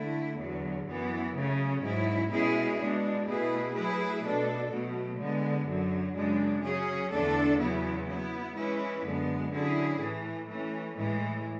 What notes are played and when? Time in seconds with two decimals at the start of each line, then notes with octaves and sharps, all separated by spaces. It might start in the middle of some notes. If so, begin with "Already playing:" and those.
Already playing: D3 A3 E4
0.38 E2 D3 F#3
0.87 F#2 E3 B3
1.35 C#3 F#3 A3 C#4
1.82 G#2 F#3 C#4 E4
2.31 B2 G#3 C#4 E4 G#4
2.79 B2 G#3 D4
3.27 B2 A3 E4 G#4 B4
3.74 F#3 A3 E4 G#4 B4
4.23 B2 A3 D4 A4
4.71 B2 F#3 A3
5.19 D3 G#3 B3
5.67 F#2 D3 F#3
6.15 F#2 C#3 G#3 D4
6.63 C#3 F#3 C#4 G#4
7.11 E2 D3 A3 D4 A4
7.59 E2 C#3 F#3 B3 E4
8.07 F#3 B3 E4
8.56 E3 G#3 C#4 E4 B4
9.04 F#2 D3 G#3 B3
9.51 D3 F#3 C#4 E4 G#4
9.99 A2 E3 A3
10.48 E3 A3 C#4
10.95 A2 E3 G#3